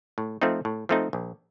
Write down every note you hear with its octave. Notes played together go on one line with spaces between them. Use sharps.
A2
F3 A3 C4 D#4
A2
F3 A3 C4 D#4
A#1